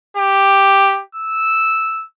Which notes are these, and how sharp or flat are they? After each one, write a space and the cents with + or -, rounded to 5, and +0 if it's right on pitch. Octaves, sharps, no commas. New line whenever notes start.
G4 +5
E6 -5